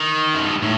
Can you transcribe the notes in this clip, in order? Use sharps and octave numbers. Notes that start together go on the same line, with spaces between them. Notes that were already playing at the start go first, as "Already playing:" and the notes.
Already playing: D#3
F#2
G2
A2